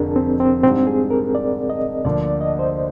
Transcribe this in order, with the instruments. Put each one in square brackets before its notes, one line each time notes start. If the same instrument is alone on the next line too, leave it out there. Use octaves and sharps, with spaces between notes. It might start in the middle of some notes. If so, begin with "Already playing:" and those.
Already playing: [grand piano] F1 F2 D3 F3 [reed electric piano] D4 G#4 A#4
[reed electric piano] C4
C4
[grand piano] G#2 G3 D4 [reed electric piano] C4
[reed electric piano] G#4
A#4
D5
D#5
[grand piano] D2 D3 F3 A#3 [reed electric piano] D5
[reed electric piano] D5
D#5
C5